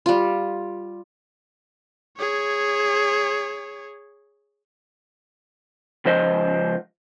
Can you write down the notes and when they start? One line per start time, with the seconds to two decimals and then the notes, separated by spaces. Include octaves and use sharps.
0.06 G3 F4
2.18 G#4 C#5
6.05 C#2 F3 C5 D#5